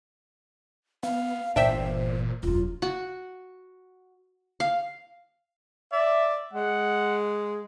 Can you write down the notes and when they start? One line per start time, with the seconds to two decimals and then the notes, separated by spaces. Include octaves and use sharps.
1.03 B3 F5
1.56 G1 A#2 E3 D4 C5 E5 G5
2.43 E1 F#2 F4
2.82 F#4
4.60 F5
5.93 D5 E5
6.54 G#3 F#5